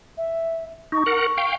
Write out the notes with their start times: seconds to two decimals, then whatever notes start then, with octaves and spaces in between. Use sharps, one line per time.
0.17 E5
0.92 D#4 C#6
1.06 A#4 F#5
1.37 F5 G5